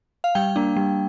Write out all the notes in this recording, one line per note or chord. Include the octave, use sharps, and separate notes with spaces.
F5
G3 G5
A#3 D4
G3